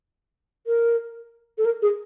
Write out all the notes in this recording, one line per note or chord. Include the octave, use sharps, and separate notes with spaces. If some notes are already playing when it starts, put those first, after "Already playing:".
A#4
A4
A#4
G#4